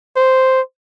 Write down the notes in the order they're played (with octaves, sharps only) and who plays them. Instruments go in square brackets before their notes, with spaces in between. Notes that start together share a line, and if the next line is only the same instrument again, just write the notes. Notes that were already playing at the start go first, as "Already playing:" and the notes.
[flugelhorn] C5